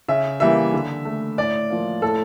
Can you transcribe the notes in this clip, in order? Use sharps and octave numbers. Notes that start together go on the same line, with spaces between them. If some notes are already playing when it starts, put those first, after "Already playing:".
C#3 E5
E3 G3 A#3 E5
D3
A3
A2 D5
F3 A#3
A2 A4